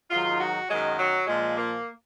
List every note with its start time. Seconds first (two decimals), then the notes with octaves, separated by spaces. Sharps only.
0.10 G#2 D#3 F#3 F4
0.40 F#4
0.69 F#2 D#3 F#3 G#3
0.99 F#3
1.27 A#2 F3 G#3
1.57 A#3